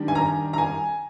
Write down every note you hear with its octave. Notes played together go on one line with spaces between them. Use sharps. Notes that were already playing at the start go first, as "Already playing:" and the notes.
Already playing: D#3 G3 D4
G#5
A#5
A#5
G#5